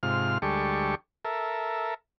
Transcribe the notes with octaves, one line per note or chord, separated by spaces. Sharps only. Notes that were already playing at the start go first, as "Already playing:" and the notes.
G#2 C3 F4 F6
D2 G3 G#3 G4 A4 C#6
A4 A#4 E5